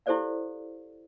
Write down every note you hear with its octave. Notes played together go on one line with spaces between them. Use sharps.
E4 G4 A4 C5 D5 F5